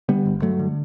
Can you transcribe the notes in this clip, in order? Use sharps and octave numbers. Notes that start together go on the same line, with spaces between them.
D3 G3 B3
G1
G2 F#3 A3
D3